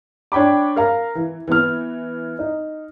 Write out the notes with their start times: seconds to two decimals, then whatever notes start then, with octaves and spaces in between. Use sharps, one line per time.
0.32 D4 C#5 G5 B5 D6
0.76 A#4 F5 A#5
1.15 E3
1.48 E3 B3 F6
2.39 D#4